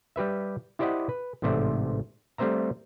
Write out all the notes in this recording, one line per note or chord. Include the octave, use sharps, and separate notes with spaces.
G3 G4 B4 E5
E4 G4 C5 D5 D#5 F#5
B4
A1 G#2 C3 A3 C5 D5
G3 A3 C4 C5 E5 A#5